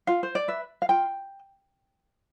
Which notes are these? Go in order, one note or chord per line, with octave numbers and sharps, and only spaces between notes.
F4 F5
C5
D5
B4 E5
F5
F4 G5